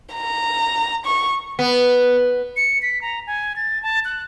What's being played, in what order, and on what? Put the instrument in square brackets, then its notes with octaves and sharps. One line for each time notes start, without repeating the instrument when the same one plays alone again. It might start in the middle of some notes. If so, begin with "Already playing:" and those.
[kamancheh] A#5
C#6
[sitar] B3
[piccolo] C#7
B6
A#5
G#5
A6
A5
F#6